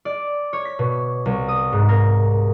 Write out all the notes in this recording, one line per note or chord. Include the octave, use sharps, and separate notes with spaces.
D5
C#5
B6
B2
C2
D#6
G#2
A#4